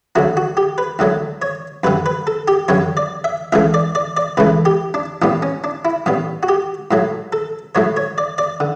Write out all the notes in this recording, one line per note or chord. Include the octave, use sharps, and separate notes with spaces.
D2 D3 F#3 A3 F#4
F#4
G4
B4
D2 D3 F#3 A3
C#5
F#2 D3 G3 B4
B4
A4
G4
F#2 D3 G3 C#5
D5
E5
C#2 C#3 E3 A3 E5
D5
D5
D5
C#2 C#3 E3 A3 B4
G4
D4
A1 A2 G3 B3 D4
C#4
D4
E4
A1 A2 G3 B3
F#4
G4
A2 F#3 A3
A4
A2 F#3 A3 C#5
C#5
D5
D5
D3